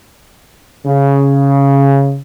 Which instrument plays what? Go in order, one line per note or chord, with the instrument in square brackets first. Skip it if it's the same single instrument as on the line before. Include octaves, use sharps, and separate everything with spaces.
[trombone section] C#3